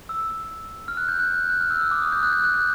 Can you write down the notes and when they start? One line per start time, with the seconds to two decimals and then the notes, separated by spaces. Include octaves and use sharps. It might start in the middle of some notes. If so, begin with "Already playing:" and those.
0.09 E6
0.88 F6
0.97 F#6
1.09 G6
1.19 F#6
1.34 G6
1.49 F#6
1.61 F6
1.70 E6
1.81 E6
1.91 D6
2.02 D#6
2.12 G6
2.23 F#6
2.32 G6
2.43 F#6
2.54 G6